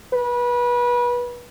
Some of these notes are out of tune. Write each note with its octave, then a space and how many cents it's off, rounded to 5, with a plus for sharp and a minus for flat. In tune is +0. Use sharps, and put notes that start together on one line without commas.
B4 -25